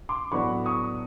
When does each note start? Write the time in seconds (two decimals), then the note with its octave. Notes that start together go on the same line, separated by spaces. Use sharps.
0.09 C6 D6
0.32 A2 F#3 B3 D4 B5 C#6
0.66 C#6 D#6